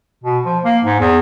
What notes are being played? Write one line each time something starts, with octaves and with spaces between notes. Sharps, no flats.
B2
F3
A#3
G#2
E2